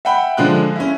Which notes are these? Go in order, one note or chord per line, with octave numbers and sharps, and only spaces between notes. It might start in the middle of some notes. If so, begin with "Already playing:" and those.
E5 F#5 G5 B5
D3 F3 G#3 F#6
C#4 E4